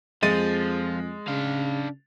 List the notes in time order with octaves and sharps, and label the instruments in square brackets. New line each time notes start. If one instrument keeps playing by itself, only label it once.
[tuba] F2 [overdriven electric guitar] F3 [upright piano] G#3 A6 D#7
[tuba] C#3 [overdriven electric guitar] D4 F5